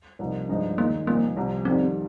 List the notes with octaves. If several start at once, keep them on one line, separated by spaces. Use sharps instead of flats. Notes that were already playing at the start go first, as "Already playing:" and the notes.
C2 C3 F3 A#3 D#4
G2 F3 G#3 D#4
D#2 D#3 G#3 A#3 D#4
C2 A#2 F3 A#3 C4 D#4
C2 C3 F3
F2 D#3 G3 C4